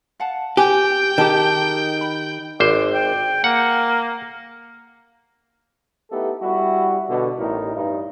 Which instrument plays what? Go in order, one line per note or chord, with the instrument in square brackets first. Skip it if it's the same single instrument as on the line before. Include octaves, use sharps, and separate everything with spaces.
[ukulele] F5 F#5 A5
[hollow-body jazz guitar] G4 [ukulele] B4 G#5 [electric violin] G5
[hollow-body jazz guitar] D#3 G4 [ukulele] G#4 A5 A#5
[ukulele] G#4
B5
[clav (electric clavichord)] G#1 C5 [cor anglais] D5
[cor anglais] G5
[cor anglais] A#3 [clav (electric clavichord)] F#5
[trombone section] A3 B3 D#4 E4 G4 A4
G3 E4 F#4
B2 D3
A1 A2 G3 D#4 E4 A#4
G2 D#4